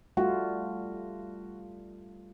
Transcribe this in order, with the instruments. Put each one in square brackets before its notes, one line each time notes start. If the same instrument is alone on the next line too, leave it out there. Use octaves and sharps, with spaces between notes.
[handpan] G3 A3 F4 [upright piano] F#4